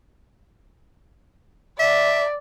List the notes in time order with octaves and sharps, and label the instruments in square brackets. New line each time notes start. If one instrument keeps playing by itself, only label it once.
[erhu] D5 [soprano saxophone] E5